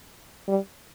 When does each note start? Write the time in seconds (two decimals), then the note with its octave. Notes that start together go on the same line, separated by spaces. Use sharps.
0.48 G3